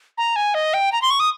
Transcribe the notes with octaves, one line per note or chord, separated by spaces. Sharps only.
A#5
G#5
D#5
G5
A#5
C6
C#6
D#6